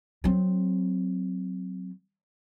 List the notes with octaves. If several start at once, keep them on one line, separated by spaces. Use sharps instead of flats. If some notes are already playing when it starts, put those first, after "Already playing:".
F#3 C4